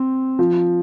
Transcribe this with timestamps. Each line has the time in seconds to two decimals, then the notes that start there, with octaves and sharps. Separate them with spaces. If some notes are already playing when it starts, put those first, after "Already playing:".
Already playing: C4
0.39 F3